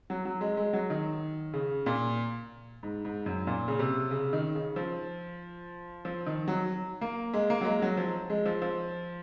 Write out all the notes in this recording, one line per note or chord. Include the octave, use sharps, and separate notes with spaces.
F#3
F#3
G#3
G#3
F#3
D#3
C#3
A#2
G#2
G#2
F#2
A#2
C#3
C3
C#3
D#3
C#3
F3
F3
D#3
F#3
A#3
G#3
A#3
F#3
G#3
F#3
F3
G#3
F3
F3